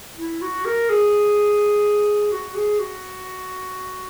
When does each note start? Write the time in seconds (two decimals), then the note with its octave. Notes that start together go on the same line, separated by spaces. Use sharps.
0.17 E4
0.42 F#4
0.65 A#4
0.89 G#4
2.32 F#4
2.55 G#4
2.79 F#4